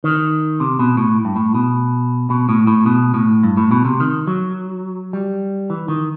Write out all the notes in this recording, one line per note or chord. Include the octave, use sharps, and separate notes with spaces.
D#3
C3
B2
A2
G2
A2
B2
B2
A2
A2
B2
A2
G2
A2
B2
C3
D#3
F#3
G3
E3
D#3